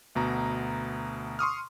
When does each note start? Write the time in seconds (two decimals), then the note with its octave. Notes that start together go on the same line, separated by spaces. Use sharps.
0.15 D2 B2 A#5
1.39 C6 C#6 D#6 F6